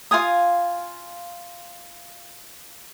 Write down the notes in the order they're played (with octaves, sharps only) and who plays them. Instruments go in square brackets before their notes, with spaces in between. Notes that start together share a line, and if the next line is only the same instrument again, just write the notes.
[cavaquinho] F4 F5 G#5 D#6